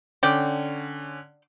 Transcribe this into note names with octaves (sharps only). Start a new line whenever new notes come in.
D3 C#4 D5 G5